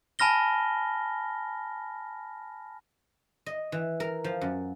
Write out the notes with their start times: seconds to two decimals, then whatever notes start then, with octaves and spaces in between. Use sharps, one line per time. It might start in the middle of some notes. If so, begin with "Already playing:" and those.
0.19 G#5 A5 B5 F6 A#6 G7
3.46 D#5
3.72 E3
4.00 A#4
4.24 F3
4.41 F#2